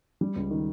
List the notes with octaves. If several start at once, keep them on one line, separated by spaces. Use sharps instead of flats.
G3
C#2
D#3